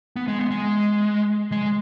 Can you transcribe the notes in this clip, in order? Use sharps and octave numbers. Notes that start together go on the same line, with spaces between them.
B3
G#3
B3
G#3
G#3